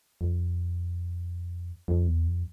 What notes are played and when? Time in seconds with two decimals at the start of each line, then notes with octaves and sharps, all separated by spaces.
0.21 F2
1.88 F2
2.07 E2
2.27 F2